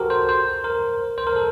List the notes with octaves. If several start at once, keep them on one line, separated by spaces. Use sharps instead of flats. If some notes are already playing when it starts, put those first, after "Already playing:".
Already playing: F#4 G4 A4 A#4 C5
C5
C5
A#4
C5
A#4
A4